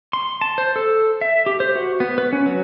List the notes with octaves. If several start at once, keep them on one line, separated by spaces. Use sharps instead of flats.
C6
A5
C5
A4
E5
G4
C5
F#4
B3
B4
C#4
F#3